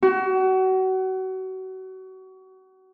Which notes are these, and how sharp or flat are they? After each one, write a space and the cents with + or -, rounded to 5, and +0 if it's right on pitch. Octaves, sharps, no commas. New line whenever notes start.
F#4 +30